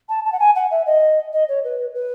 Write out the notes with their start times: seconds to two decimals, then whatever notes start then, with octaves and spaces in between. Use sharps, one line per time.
0.09 A5
0.25 A5
0.32 F#5
0.40 G#5
0.55 F#5
0.71 E5
0.86 D#5
1.33 D#5
1.48 C#5
1.64 B4
1.95 B4